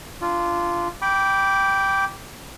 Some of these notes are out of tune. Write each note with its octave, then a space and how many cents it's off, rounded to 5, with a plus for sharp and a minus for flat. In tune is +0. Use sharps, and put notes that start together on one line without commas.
D4 +0 F4 -15
G5 +0 B5 -5 D6 -15